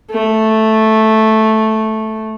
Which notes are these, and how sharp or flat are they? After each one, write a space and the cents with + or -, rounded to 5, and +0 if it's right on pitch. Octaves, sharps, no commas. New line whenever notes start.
A3 -5